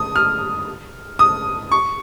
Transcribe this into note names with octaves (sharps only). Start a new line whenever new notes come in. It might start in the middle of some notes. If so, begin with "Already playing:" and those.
Already playing: D#6
F6
D#6
C#6